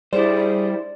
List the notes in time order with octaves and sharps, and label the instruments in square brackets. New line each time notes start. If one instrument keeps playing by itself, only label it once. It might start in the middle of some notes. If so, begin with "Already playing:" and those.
[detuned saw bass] G3 [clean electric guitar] E4 C5 [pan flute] G#4 [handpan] D5